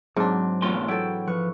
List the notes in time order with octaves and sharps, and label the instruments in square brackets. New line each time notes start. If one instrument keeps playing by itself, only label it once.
[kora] G#2 D4 [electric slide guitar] F#3 [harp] C4
[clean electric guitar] B2 A3 C6 [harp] E3 F4
[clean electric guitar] F#3 [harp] E4 A4 [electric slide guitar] G5
[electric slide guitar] F3 B4 [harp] C#6